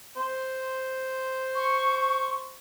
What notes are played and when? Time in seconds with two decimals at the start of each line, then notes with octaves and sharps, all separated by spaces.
0.16 C5
1.55 C#6